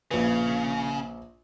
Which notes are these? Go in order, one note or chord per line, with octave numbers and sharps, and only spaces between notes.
A#1 C#3 B4